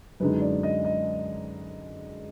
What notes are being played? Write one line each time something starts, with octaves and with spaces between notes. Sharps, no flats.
F#2 D3 G#3 D#4 B4
D5
D#5
D#5